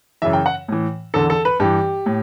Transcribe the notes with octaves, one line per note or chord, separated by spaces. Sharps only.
F#2 C#3 E3 E5
G5
F#5
A2 E3
E2 D3 A4
A4
B4
G2 E3 G4
A2